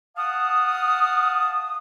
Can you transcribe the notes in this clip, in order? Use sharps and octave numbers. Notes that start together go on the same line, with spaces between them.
F5 F#5 A5 D#6